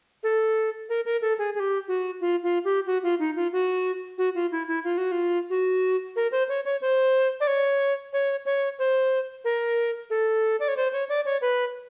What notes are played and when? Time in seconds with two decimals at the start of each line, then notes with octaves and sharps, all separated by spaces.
0.23 A4
0.89 A#4
1.05 A#4
1.22 A4
1.39 G#4
1.55 G#4
1.60 G4
1.88 F#4
2.21 F4
2.43 F4
2.65 G4
2.86 F#4
3.03 F4
3.19 D#4
3.36 F4
3.52 F#4
4.18 F#4
4.35 F4
4.52 E4
4.68 E4
4.84 F4
4.98 F#4
5.12 F4
5.50 F#4
6.16 A#4
6.32 C5
6.49 C#5
6.65 C#5
6.82 C5
7.40 D5
7.47 C#5
8.13 C#5
8.46 C#5
8.79 C5
9.45 A#4
10.10 A4
10.60 D5
10.68 C#5
10.77 C5
10.93 C#5
11.09 D5
11.26 C#5
11.42 B4